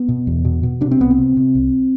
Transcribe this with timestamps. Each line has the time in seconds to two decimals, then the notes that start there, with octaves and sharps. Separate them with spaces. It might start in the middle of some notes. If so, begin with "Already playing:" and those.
Already playing: B3
0.09 B2
0.27 E2
0.45 B2
0.63 B2
0.81 C3 D4
0.91 C4
1.00 C2 B3
1.11 C4
1.18 C3
1.37 C3
1.55 C2